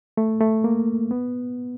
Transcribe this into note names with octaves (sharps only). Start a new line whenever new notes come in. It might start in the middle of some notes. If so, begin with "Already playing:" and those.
A3
A3
A#3
B3